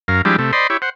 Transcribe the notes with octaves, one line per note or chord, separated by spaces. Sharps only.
F#2 A#4 F5
F3 G3 G#3 D4 E4 G4
C3 A3
C5 D5 D#5 B5 C6
E4 G4 C#5
C5 F#5